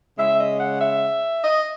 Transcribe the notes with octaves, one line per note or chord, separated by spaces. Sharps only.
C#3 G#3 E5
D#5
F#5
E5
D#5